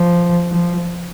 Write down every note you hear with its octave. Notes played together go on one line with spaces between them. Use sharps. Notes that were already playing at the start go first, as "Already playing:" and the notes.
Already playing: F3
F3